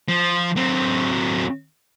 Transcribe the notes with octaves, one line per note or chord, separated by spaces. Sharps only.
F3
F#3 C4